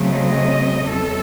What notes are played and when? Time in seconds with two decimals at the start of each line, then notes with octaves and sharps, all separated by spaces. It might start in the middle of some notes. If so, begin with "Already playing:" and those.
Already playing: C#3 F#3 A3 C4
0.12 D#5
0.87 E2 C3 F#3 C#4 A4